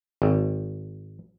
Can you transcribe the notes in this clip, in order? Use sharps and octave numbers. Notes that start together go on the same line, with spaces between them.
G#1